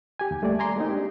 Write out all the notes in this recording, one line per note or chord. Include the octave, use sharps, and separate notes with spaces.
G4 G#5
D#2 G#5
G3 A3 A#3 G4 D5
G#5 A#5 C6 D6
G#3 A#3 C4 D#4
D4 G4